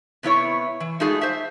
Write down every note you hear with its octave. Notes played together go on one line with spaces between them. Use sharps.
C3 B3 E4 C#5
E3
G#3 A3 D#4 F4 F#4 G#4
C5 E5